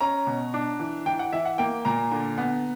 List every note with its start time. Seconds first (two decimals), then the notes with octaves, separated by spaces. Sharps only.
0.01 C#4 A#5
0.27 B2
0.54 D4
0.80 E3
1.06 E3 G5
1.19 F#5
1.33 E3 E5
1.45 F#5
1.58 A#3 G5
1.85 A#2 A#5
2.11 D3
2.38 B3